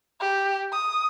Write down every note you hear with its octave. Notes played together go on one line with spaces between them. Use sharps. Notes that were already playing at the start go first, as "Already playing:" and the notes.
G4
D#6